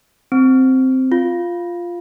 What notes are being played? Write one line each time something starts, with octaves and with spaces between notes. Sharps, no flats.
C4
F4